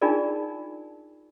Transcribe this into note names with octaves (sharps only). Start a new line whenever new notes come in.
D4 D#4 F4 G#4 A#4 D5